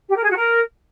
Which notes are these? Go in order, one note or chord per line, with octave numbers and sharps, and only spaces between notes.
G4
A#4
G#4
F#4
A#4